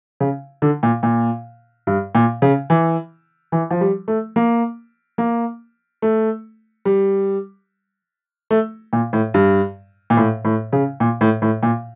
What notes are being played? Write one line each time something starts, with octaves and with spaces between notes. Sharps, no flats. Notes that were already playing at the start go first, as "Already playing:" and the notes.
C#3
D3
A#2
A#2
G2
A#2
C#3
E3
E3
F3
G3
A3
A#3
A#3
A3
G3
A3
A#2
A2
G2
A#2
A2
A2
C#3
A#2
A2
A2
A#2